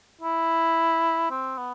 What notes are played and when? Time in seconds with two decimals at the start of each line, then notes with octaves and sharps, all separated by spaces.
0.21 E4
1.30 C4
1.57 B3